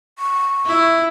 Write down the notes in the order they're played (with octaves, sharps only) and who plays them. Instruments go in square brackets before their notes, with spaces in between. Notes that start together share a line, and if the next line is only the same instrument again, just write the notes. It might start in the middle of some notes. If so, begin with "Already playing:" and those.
[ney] C#6
[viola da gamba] E4